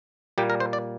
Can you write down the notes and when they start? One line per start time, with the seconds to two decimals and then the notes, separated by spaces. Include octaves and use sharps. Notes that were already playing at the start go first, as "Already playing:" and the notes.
0.38 A#2 G3 A#3 G4
0.50 A#4
0.60 C5
0.73 D5